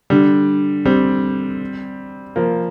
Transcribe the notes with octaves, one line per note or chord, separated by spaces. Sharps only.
D3 G3
G3 C4
F3 A#3